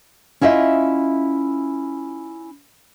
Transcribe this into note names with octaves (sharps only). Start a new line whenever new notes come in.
C#4 E4 F4 D#5 E5